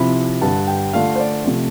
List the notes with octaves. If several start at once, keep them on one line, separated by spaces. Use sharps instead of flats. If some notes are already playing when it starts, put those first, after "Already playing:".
Already playing: C3 F3 C4 E4 B5
G2 D3 G3 A5
G5
D3 A3 D4 F4 F5
C5
D5
C3 F3 A3